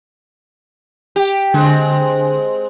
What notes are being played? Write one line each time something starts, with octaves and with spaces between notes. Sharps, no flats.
G4
D3 G#3 C4